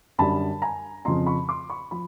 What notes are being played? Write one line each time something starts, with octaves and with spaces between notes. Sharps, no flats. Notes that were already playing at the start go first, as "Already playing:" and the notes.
F#2 D3 G3 A5 B5
G#5 A#5
F2 C#3 F3 A#5 C6
B5 C#6
C6 D6
B5 C#6
F3 B5